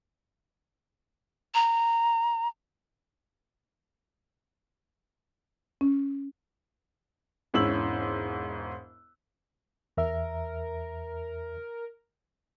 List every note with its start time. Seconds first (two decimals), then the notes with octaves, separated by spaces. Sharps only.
1.54 A#5
5.81 C#4
7.54 E1 G#2 C#4 E4 E6 F#7
9.97 E2 A#4 E5